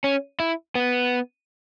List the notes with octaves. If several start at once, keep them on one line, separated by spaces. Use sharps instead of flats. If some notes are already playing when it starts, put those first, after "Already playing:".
C#4
E4
B3